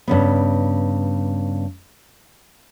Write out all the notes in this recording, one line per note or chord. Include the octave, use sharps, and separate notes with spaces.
G2 C#3 B3